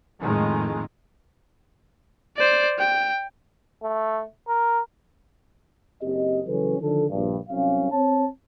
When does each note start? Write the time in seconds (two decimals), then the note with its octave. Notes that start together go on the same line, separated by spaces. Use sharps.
0.22 F2 A2 D#3 G#3
2.37 C5 D5
2.79 G5
3.83 A3
4.48 A#4
6.02 F#1 C4 G4 D#5
6.47 C#3 E3 F#3 C#4 A4 B4
6.81 D3 D#3 F3 A4
7.09 A#1 G2
7.49 C2 C3 F#3 C#4 F5
7.91 C4 C#5 A5